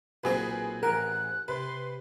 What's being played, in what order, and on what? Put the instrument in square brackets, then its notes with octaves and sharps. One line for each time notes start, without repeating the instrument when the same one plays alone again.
[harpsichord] B1 A#2 A#5 [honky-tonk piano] C4 G#4 B4
[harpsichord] A1 F#5 [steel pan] A#4 [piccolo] F#6
[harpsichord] C3 [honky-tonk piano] B4 [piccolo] C6